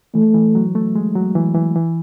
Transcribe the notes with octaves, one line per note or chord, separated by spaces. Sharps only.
E3 A3
E3
F#3
A3
G#3
F#3
E3
E3
E3